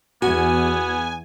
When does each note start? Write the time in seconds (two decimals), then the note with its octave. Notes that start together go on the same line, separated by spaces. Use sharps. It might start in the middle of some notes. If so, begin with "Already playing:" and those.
0.22 E2 B3 F#4 G#5